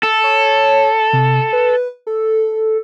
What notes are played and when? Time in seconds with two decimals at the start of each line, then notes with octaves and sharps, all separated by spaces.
0.03 A4
0.24 C#5
1.13 C3
1.53 B4
2.07 A4